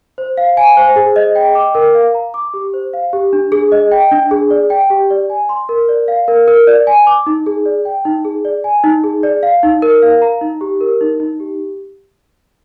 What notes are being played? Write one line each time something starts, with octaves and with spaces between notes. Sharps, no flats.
C5
F5
G#5
C5
G#4
D#5
G5
D6
A#4
F5
A#5
D6
G4
C5
F5
G4
D4
G#4
D#5
G5
D4
G#4
D5
G5
G4
D5
G#5
C6
A#4
D5
F5
A#4
A#4
D5
G#5
D6
D#4
G#4
D5
G5
D#4
G#4
D5
G#5
D#4
G#4
D5
F5
D#4
A#4
F5
A#5
D#4
G4
A#4
D#4
D#4
G4